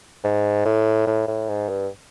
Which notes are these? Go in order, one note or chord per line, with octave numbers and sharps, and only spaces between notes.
G#2
A2
A2
A2
G#2
G2